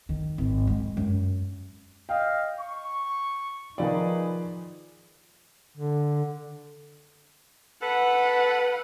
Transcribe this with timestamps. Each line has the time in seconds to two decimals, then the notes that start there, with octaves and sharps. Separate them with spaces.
0.09 D#3
0.38 G#1
0.67 G#3
0.97 F#2
2.09 D#5 F5 G5
2.59 C#6
3.78 D#3 F3 D#4 G#4 B4 D5
5.77 D3
7.83 A4 B4 F#5